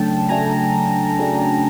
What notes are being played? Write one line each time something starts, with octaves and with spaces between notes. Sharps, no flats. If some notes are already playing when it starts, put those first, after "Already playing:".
Already playing: C#3 F#3 A3 D4 G5 A5
C#3 F#3 A3 D4 G#5 A#5
C#3 F#3 A3 D4